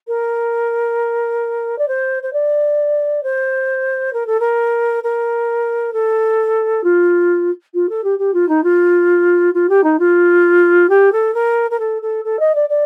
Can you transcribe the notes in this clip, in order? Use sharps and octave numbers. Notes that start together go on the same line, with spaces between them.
A#4
D5
C5
C5
D5
C5
A#4
A4
A#4
A#4
A4
F4
F4
A4
G4
G4
F4
D#4
F4
F4
G4
D#4
F4
G4
A4
A#4
A#4
A4
A4
A4
D#5
D5
D5